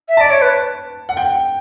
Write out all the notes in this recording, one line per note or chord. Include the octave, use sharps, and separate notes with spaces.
E5
D5 A5
C#5
B4
F#5
G5